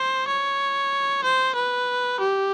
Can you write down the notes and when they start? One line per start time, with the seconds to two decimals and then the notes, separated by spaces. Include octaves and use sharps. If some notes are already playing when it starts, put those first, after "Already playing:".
Already playing: C5
0.28 C#5
1.24 C5
1.55 B4
2.20 G4